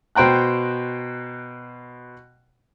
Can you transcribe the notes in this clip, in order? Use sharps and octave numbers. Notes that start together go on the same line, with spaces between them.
B2 C5 G5 A#5 F#6